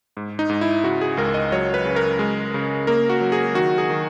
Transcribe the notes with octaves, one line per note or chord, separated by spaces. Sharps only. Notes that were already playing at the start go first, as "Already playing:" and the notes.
G#2
D#4
G#2
E4
C#3 F#4
G#4
C#2 A#4
D#5
F#3 C#5
B4
C#3
A#4
G#3
C#3
A#3 A#4
F#4
F#3
G#4
D#3 F#4
G#4
D#3